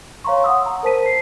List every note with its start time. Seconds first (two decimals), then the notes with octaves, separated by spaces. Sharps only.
0.24 C#5 F5 A#5 C6 C#6
0.44 F#5 D#6 E6
0.66 A#5
0.83 A#4 C5 A5 B6 D#7
1.06 C7